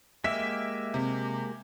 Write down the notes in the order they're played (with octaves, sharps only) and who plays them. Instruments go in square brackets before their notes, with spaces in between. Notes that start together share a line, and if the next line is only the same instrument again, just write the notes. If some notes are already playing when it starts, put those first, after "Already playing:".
[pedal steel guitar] G#3 A#3 G4 [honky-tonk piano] E5 B6
[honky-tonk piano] C3